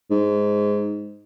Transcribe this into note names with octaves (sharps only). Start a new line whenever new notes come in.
G#2